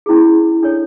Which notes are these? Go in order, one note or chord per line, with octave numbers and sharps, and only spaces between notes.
C#4 E4 G#4
D4 A4 C#5